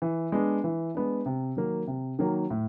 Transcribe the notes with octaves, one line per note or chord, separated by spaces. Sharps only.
E3
G#3 B3 D4
E3
G#3 B3 D4
C3
D#3 F#3 A#3
C3
D#3 F#3 A#3
A2